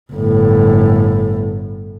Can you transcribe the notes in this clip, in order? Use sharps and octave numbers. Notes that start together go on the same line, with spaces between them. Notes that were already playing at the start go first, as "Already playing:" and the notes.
G1 A2